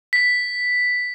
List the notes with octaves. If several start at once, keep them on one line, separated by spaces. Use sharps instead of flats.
B6